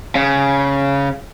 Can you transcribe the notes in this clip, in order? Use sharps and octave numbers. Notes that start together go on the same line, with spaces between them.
C#3